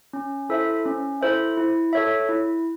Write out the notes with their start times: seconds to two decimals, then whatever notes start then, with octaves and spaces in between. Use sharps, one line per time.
0.13 C#4
0.49 E4 A4 C5 E5
0.86 C#4
1.21 E4 A4 C5 E5
1.57 E4
1.93 A4 C#5 E5
2.29 E4